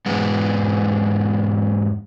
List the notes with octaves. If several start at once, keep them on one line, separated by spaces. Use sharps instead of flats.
E2 G#2 G#3 B3